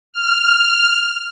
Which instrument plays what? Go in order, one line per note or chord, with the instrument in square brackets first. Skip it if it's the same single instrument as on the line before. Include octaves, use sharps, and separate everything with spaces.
[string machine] F6